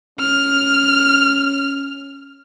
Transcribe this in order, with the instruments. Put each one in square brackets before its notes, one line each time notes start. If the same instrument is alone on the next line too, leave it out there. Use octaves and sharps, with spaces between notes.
[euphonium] C#4 [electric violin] F6